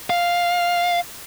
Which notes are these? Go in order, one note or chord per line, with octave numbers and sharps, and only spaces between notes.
F5